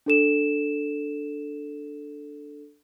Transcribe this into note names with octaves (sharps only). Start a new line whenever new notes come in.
D4 A4 E7